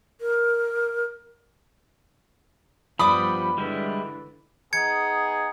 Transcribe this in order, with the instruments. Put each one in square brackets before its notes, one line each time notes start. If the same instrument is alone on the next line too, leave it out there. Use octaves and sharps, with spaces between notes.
[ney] A#4
[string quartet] G2 B3 [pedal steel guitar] F3 G3 [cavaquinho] D5 D6 D#6 [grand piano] B5
[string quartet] D3 E3 [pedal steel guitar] G3 G#3 E4
[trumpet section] B3 D#4 G#4 [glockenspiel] G#6 C#7